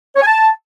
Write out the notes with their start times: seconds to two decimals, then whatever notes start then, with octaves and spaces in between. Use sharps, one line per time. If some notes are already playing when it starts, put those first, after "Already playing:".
0.16 C#5
0.22 G#5
0.27 A5